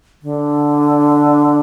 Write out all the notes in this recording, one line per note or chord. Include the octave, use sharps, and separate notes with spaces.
D3